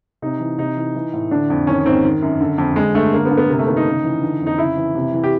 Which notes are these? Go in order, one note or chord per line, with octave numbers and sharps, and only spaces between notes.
C3 D#4
E3
C3 D#4
E3
E3
A2
D3 D4
F2
D#3 C#4
G#2 C4
D#3
F#2
D3
F2
D3 G#3
G2 A3
D3 A#3
B3
G2
B3
C3 A#3
A3
D#3 B3
D#4
C#3
E3
D3
F2
D#4
C#3 E4
E3
C3
E3
G4